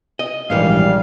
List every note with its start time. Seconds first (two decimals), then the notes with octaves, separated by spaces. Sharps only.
0.19 D#5
0.50 A#1 G#2 C#3 E3 G3 A#3 F5